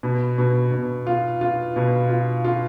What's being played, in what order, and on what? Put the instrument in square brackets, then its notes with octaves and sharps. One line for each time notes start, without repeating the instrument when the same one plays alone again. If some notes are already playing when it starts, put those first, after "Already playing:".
[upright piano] B2
B2
B2
F4
F4
B2
F4
F4